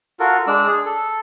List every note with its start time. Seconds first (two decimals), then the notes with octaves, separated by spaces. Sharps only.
0.20 F4 F#4 A4 A#4
0.47 G#3 D4 D5 E6
0.67 G#4
0.85 A4